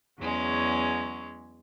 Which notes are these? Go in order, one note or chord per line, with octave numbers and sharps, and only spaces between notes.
E2 F#3 G#3 C#4